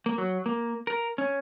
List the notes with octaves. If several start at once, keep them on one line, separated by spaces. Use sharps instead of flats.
A#3
F#3
A#3
A#4
C#4